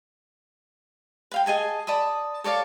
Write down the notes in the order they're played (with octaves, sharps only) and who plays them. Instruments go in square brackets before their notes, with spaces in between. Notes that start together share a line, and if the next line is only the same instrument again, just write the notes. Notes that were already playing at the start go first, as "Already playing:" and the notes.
[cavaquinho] B4 F5 G5
G#4 D#5 G#5 A5
D5 A5 B5 D#6
A4 C#5 D5 F5